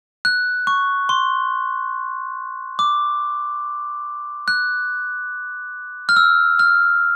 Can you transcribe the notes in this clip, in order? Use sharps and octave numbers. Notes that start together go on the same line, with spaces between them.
F#6
C#6
C6
D6
F#6
F6
E6
F6